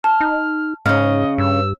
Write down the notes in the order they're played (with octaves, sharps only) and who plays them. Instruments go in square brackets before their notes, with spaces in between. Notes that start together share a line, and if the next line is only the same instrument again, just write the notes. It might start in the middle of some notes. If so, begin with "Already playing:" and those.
[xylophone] A5 [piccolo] F6
[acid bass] D#4
[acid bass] G#2 [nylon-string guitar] C#3 C#4 [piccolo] D#5 [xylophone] F6
[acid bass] G2 [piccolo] E6